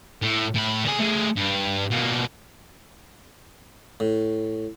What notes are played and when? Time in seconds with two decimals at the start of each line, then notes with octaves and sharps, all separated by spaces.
0.22 A2
0.55 A2 B5
0.83 D3 G#4
0.99 A3 G#4
1.36 G2
1.91 B2 A#3
4.00 A2